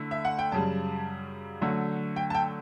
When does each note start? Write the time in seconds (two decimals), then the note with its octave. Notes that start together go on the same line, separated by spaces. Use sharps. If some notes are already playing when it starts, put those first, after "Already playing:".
Already playing: D3 A3 E4
0.11 E5
0.25 F#5
0.39 G5
0.52 F#2 C#3 G3 A5
1.62 D3 F#3 A3
2.16 G5
2.30 A5
2.35 G5